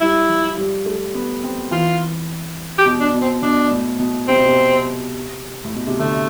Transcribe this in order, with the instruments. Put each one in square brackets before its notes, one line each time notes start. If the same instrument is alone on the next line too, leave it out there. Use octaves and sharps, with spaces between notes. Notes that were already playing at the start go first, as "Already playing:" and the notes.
[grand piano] G3 [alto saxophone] E4
[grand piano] F3
G3
A3
B3
C4
[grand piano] E3 [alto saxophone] F4
[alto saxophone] G4
[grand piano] B2
[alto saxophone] D4
[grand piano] B2
[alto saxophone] C4
[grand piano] B2 [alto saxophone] D4
[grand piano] A2
B2
[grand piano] C3 [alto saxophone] C4
[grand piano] B2
C3
A2
B2
C3
[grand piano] D3 [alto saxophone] A3